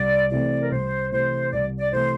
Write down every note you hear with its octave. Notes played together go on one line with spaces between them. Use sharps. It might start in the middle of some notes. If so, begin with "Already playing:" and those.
Already playing: C2 D5
C3 E3 A3 C4 D5
A#4
C2 C5
C3 E3 A3 C4 C5
C2 D5
D5
C3 E3 A3 C4 C5